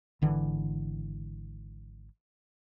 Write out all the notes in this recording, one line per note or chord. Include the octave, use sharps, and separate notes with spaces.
G#1 D3 E3